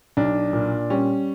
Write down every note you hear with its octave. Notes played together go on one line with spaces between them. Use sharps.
B1 D4
A#2
G3 C#4